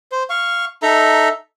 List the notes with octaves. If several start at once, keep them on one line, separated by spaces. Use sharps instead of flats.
C5
F5 C#6
D#4 A4 E5 A#5